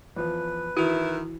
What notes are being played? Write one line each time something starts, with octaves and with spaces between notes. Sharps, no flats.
E2 F3 B4
D#3 E3 E4 F#4 F7